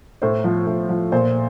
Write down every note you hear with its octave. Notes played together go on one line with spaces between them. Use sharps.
A2 C5
F3
A2
F3
A#2 C5